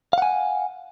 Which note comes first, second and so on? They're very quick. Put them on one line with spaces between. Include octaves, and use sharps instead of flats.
F5 F#5 G#5